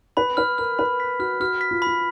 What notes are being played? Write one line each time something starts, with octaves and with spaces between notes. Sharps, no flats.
B4 B5
B4 F6
A#4 F6
B4 B5
B6
F#4 F6
F#4 F6
B6
F4
F4 B5